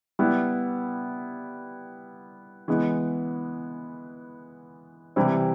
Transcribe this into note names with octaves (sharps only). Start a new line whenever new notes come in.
G3 B3 E4
E3 G#3 B3
C3 E3 G3 C4 E4